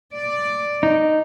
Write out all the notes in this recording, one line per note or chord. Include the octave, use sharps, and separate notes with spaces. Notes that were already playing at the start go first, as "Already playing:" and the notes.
D5
D#4